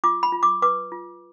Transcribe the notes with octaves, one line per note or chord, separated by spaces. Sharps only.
F4 D6
B5
F4
D6
B4 D6
F4